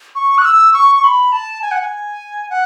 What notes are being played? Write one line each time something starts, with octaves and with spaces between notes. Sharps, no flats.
C#6
F#6
E6
C#6
C#6
B5
A5
G#5
F#5
G#5
F#5